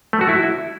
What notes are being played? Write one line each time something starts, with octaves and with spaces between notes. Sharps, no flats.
A3
F#4
E4